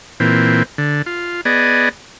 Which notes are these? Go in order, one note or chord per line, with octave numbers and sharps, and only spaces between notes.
A#2 E3 C4
D3
F4
B3 G#4 D5 D#5